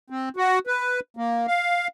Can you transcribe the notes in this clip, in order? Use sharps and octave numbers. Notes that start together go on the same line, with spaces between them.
C4
F#4
B4
A#3
F5